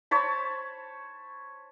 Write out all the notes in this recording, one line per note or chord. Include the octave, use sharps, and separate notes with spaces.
C5 C#5 A5 B5